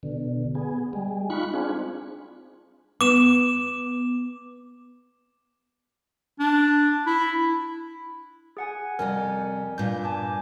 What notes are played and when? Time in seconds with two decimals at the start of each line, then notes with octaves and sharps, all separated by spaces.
0.03 B2 D3
0.55 B3 G#4
0.93 G3 G#3
1.30 D#4 F4 B5 C#6 F#6
1.54 C4 D4 F4 G#4
3.01 B3 D6 E7
6.40 D4
7.06 E4
8.57 G#4 F#5 G#5
8.99 F2 C3 G3 A#4 G#5
9.78 G2 A#2 G6
10.04 G#5 A5 D6